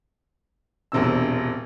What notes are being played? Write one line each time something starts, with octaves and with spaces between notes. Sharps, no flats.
E1 A#1 C3 E6